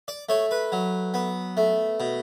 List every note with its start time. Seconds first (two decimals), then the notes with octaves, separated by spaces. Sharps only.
0.08 D5
0.29 A3 C#5
0.51 B4
0.72 F#3
1.14 B3
1.57 A3
2.00 B2